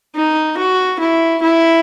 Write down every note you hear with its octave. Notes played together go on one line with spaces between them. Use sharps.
D#4
F#4
E4
E4